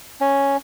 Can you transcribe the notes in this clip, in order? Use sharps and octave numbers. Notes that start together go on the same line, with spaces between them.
C#4